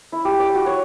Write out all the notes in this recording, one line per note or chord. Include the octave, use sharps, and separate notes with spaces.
E4
G4
D5
F#4
C#5